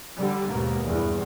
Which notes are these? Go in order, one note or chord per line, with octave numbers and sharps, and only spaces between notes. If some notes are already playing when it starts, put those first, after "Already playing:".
D3 G3
D#2 G#2 B2 A#3
E2 G2